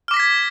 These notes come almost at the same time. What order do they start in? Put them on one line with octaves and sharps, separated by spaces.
F6 D6 A#6 B6 G#6